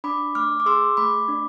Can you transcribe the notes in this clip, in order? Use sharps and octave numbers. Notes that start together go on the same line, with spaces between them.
D4 B5 D6
A3 D6 F6
D6
G#4 C6 E6
A3 B5 D6
D4